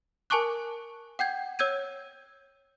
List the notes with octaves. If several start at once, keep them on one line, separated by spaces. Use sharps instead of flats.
A#4 G#5 A5 C#6 D6 F#6
F#5 G5 G6 G#6
C#5 E6 G6 G#6 D#7